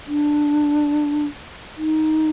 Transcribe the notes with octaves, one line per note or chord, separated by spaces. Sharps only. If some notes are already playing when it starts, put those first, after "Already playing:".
D4
D#4